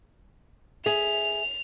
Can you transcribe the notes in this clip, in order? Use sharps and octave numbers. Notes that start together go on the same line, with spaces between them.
G#4 E5 F7